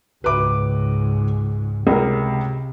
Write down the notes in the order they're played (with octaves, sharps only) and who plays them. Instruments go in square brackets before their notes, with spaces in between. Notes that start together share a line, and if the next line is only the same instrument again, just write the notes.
[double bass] C#2 G#2 [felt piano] B4 D6
[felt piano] C#2 A#4 [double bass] C3